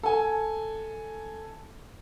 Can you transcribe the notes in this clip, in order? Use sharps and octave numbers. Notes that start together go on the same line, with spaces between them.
A4 G#5